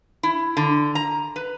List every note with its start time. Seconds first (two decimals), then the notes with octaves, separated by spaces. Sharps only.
0.23 E4
0.57 D3
0.95 A#5
1.36 B4